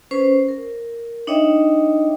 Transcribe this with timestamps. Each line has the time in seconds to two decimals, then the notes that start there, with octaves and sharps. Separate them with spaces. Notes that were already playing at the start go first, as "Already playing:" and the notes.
0.11 C#4 B4 C5
0.49 A#4
1.27 D4 D#4 C#5 D#5 E5 G5